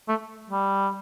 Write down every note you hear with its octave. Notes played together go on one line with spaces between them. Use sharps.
A3
G3